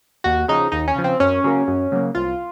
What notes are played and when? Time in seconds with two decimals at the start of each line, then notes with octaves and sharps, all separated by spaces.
0.24 D#2 F#4
0.48 C#3 F3 D#4
0.72 D#2 D#4
0.88 C#4
0.96 C#3 F3
1.04 C4
1.20 F#2 C#4
1.44 C#3 F#3 A#3
1.68 F#2
1.92 C#3 F#3 A#3
2.15 C2 F4